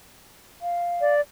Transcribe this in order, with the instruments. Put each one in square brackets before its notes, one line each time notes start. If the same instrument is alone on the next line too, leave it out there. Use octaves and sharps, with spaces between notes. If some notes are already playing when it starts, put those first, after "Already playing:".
[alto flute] F5
[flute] D5